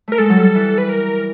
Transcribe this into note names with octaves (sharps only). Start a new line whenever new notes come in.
A3 A#4
G#3 A4
F#3
G3
E3
B4
A#4